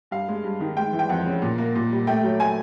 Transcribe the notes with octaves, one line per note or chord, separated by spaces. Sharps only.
G2 F5
G#3
G2
D#3
G#3 G5
E3
G5
F2 F#5
C#3
A#2
A#3
A#2
G3
A3 G5
F#3
G#5